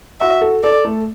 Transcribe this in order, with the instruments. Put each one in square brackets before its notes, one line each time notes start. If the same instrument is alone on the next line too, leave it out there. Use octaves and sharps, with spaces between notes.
[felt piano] F#4 [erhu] E5
[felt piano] A4
[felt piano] A4 [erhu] D5
[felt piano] A3